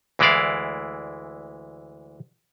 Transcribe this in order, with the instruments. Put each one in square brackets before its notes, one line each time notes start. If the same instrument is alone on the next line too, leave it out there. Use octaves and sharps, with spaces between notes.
[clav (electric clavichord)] D2 E3 G#3 E4 D5 F5